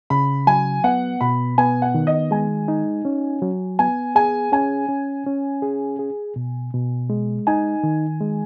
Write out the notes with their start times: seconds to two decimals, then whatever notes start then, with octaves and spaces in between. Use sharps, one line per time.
0.10 C#3 B5
0.47 F#3 G#5
0.84 B3 F#5
1.21 B2 B5
1.58 B3 G#5
1.82 F#5
1.95 D#3
2.07 D#5
2.31 G#3 G#5
2.68 D#4
3.05 C#4
3.42 F#3
3.79 B3 G#5
4.15 G#4 G#5
4.52 C#4 G#5
4.89 C#4
5.27 C#4
5.62 G#4
5.99 G#4
6.36 B2
6.74 B2
7.10 G#3
7.47 D#4 G#5
7.83 D#3
8.21 G#3